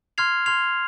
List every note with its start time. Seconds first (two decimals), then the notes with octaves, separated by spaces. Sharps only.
0.18 C6 F6 G#6 C7 F7
0.46 C6 F6 G#6 C7 F7